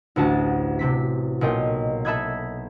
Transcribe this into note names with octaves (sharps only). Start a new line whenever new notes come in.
A1 D2 F#4 A5
C3 C4 B6
B1 A#2 D#5 G5
A4 E5 B5 D#6 F#6 G#6